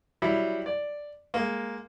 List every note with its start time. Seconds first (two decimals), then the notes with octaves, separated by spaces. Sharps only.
0.22 F#3 G3 E4
0.66 D5
1.34 G#3 A#3